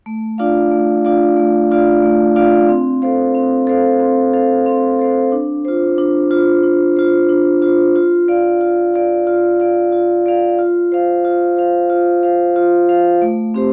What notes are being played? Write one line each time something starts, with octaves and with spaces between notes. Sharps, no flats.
A3
D4 F4 D5 F5
A3
D4 F4 D5 F5
A3
D4 F4 D5 F5
A3
D4 F4 D5 F5
C4
A4 C5 F5
C4
A4 C5 F5
C4
A4 C5 F5
C4
A4 C5 F5
D4
F4 C5
D4
F4 C5
D4
F4 C5
D4
F4 C5
F4
D5 F5
F4
D5 F5
F4
D5 F5
F4
D5 F5
F4
C5 F5
F4
C5 F5
F4
C5 F5
F4
C5 F5
A3
C4 G4 C5